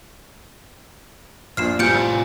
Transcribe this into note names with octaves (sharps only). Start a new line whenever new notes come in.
A#1 A#2 D4 F6 C7 E7
F2 A2 G3 F4 G#5 G6 C#7 D7